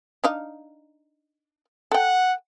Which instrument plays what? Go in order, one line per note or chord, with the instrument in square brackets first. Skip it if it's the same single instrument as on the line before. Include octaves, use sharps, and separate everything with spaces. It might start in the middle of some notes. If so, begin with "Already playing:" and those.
[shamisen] D4 D#4 F5
[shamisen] A4 G5 [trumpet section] F#5